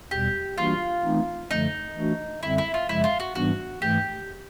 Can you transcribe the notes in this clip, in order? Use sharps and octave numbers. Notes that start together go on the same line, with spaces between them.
E2 B2 G3 G4
E3 G3 A#3 D4 F4 F#4
E3 A3 C4 D#4
F#2 D3 F3 A3 D#4
E3 A3 D4 F#4
F#2 D3 G3 C4 E4
E4
F4
F#2 C#3 F3 G#3 E4
F4
F#4
G#2 E3 G3 B3 D4 F#4
G#2 E3 A3 G4